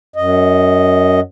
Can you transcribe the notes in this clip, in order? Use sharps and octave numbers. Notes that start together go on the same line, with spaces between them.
F#2 D#5